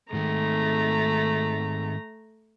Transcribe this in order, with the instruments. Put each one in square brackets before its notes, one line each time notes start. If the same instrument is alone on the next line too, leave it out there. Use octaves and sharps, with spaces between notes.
[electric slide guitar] G#2 D#3 [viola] A3 A#5